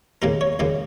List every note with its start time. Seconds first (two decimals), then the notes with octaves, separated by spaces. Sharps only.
0.22 D#2 C#3 A#3 A#4
0.41 C#5
0.59 D#2 C#3 A#3